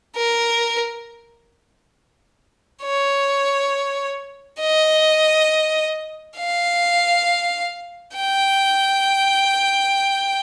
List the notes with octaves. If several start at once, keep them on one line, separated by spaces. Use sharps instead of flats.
A#4
C#5
D#5
F5
G5